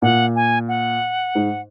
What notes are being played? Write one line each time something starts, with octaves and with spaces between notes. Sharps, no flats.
A#2 F#5
G#5
F#5
G#2